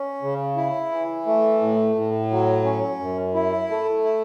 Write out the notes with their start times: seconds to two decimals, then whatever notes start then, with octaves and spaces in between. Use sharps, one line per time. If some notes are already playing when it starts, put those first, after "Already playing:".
Already playing: C#4
0.22 C#3
0.57 E4
0.91 E3
1.26 A3
1.61 A2
1.95 A2
2.31 F#3
2.65 C#4
2.99 F#2
3.34 E4
3.70 A3
4.04 E4